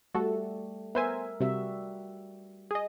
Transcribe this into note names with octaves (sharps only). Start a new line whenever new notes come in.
G3 A3 F#4 A4
B3 A#4 C5 E5 G#5
C3 G3 F#4 E5
G#4 D#5